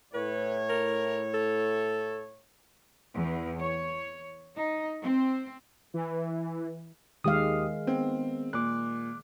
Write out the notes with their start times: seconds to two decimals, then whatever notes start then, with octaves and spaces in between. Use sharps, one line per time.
0.14 A2 B4 C#5
0.69 A#4
1.34 A4
3.14 E2
3.61 C#5
4.55 D#4
5.02 C4
5.94 E3
7.24 D#2 D#3 G#3 G4 F5 D#6
7.87 B3 C4
8.53 A#2 D6 F#6